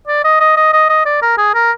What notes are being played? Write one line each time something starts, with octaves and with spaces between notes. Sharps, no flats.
D5
D#5
D#5
D#5
D#5
D#5
D5
A#4
G#4
A#4